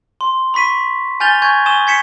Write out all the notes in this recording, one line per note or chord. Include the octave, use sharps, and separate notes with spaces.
C6
B5 C#6 B6 D#7
G#5 F6 G6 A6 F7 G7
G#5 C#6 G6 G#6
G#5 C#6 D#6 E7 G7
G#6 B6 C#7 E7